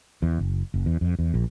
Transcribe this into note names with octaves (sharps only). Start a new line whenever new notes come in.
E2
F#1
F#1
E2
F2
E2
A#1